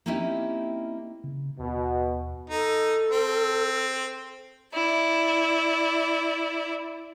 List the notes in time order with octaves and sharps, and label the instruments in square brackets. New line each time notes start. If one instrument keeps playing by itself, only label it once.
[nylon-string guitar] A#3 C4 C#4 D#4 E4 G4
[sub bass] C#3
[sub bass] D#2 [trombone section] B2
[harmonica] D#4 [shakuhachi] A4
[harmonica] C4
[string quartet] E4 D5